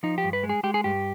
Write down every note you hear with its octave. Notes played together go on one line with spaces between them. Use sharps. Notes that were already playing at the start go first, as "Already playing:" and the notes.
F3 D#4
G4
G2
B4
G#3
G#4
G#3 G4
G#4
G2 G4